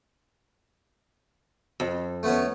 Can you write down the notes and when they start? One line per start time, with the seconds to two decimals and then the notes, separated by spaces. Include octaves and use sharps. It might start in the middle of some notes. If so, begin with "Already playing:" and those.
1.80 F2
2.23 A3 B3 C#4